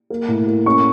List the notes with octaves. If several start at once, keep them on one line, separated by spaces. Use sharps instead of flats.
A#3
A2
A#3
C#4 C#6